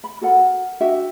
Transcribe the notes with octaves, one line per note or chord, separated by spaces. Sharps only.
B5
F#4 A4 A#4 F#5
D4 F#4 E5 G5